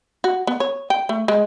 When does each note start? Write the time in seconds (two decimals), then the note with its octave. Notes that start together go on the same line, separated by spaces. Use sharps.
0.24 F#4
0.47 B3
0.60 C#5
0.90 G5
1.09 A3
1.28 G#3